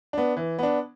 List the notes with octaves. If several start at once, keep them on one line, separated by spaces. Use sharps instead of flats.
B3 D4
E3
B3 D4